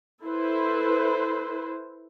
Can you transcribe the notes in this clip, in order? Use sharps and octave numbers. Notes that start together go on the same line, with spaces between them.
E4 A4 B4 C5